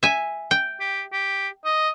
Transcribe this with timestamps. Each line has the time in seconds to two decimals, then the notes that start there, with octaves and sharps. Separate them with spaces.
0.03 E5 G#5
0.51 G5
0.80 G4
1.13 G4
1.65 D#5